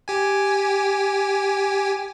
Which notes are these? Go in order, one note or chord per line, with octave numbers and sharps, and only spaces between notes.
G4 G#5